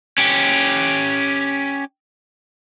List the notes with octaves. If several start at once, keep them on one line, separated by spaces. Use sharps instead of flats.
C#4 G4